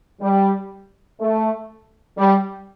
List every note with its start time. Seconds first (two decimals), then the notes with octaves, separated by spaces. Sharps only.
0.21 G3
1.20 A3
2.18 G3